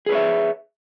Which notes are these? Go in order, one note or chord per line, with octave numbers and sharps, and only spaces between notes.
G#4 B4 C#5 E5